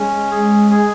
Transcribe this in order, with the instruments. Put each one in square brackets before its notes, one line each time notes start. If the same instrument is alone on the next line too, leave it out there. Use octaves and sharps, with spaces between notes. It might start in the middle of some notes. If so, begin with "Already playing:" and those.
Already playing: [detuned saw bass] G#3 [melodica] C#4
[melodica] G#4
G#4